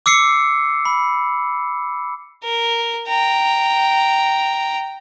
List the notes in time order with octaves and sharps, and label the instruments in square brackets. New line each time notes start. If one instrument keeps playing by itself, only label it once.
[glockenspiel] D6 E6 C7 C#7
B5
[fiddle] A#4
G5 A#5